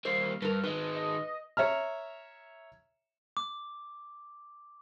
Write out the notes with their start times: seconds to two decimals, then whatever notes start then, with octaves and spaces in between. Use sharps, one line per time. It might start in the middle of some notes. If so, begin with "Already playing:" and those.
0.05 G3 A#3 C5
0.42 G2 A#4 B4
0.64 D#3 G#3 B4
0.95 D#5
1.57 C#5 E5 A#5 F6
3.37 D6